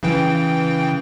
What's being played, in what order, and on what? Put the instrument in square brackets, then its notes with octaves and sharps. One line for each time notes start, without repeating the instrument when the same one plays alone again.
[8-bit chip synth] C#3 E3 G5